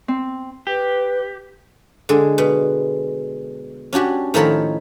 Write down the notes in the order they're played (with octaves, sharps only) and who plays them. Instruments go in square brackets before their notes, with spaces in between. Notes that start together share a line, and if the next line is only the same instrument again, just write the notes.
[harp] C4
[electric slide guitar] G4 [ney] B4
[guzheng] D3 G#3
B2
C#4 D4 F#4 G4
A2 D#3 F3 A#4 C#5 B5